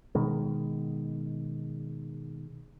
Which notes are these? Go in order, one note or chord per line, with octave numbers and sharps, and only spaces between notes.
B2 D#3 G#3